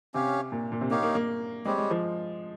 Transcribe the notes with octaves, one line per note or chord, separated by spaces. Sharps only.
C3 C#4 G4 C#5 F5
A#2
A#2
C3
A#3 D#4 G4 C#5 F5
A#3
A#3
G3 G#3 C4 G4 C#5
G#3
F3